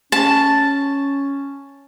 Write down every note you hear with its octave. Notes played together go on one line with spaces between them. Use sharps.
C#4 A5